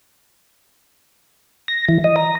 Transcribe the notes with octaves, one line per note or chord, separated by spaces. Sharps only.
A#6
E3
D#5
A#5